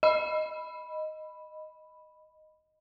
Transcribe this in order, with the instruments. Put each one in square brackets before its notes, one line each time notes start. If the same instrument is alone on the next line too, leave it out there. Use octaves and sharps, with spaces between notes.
[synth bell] D#5 B5